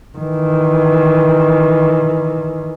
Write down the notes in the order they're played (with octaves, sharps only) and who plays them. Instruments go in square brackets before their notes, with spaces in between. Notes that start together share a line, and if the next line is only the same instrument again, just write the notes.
[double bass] D#3 E3